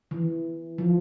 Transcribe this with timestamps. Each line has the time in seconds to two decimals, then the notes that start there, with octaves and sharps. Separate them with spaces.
0.11 E3
0.78 F3